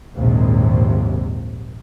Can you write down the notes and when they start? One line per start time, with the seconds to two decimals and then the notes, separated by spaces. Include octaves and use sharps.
0.17 A#1 D#2 G#2 C3